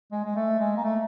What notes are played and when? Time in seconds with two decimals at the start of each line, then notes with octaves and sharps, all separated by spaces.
0.12 G#3
0.24 G#3
0.35 A3
0.59 G#3
0.77 A#3
0.84 A3